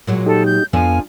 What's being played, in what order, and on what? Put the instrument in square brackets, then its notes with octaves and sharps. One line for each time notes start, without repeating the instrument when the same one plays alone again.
[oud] A#2 F#3 G#3
[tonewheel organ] D#4 G4 [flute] A4
[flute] G6
[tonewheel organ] F2 B3 F5 [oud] F3 D4 A4 [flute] G#5